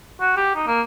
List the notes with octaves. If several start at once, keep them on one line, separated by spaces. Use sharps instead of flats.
F#4
G4
D#4
A#3